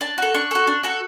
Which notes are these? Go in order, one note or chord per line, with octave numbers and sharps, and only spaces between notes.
D4 A5
F#4 A4
D4 C#6
F#4 A4
D4
F#4 A4